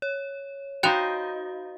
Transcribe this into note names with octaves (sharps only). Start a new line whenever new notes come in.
C#5
D#4 F#4 C5 F5 G5 F#6 F7